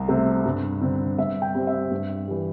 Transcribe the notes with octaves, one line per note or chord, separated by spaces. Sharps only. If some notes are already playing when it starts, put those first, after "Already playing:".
Already playing: C2
C3 A3 C4
G2
D3 C4
G2 E5
G5
G3 C4
E5
G2
E3 G3